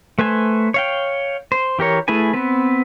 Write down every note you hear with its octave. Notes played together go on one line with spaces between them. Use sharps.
A3 B4 C5 G#5
C#5 F5 G5
C5
E3 G4 A#4 C#5
A3 E4 G#4 B4 G#5
B3 C4 B4